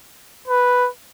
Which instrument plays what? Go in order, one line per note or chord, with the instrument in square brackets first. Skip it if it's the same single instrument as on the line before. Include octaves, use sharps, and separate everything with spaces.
[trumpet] B4